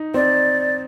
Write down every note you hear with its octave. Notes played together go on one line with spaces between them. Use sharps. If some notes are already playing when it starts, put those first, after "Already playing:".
Already playing: D#4
C4 D5